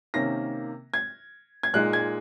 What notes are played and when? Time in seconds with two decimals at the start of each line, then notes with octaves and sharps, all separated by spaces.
0.14 C3 D#3 A#3 C#4 A#6
0.94 G#6
1.63 G#6
1.74 A#2 G#3 D#4 F#6
1.93 G#6